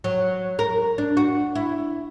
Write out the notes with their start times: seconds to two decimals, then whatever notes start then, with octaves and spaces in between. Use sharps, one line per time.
0.04 F#3
0.59 A#4
0.98 D4
1.17 F#4
1.55 E4